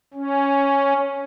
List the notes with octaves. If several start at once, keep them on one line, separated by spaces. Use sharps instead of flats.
C#4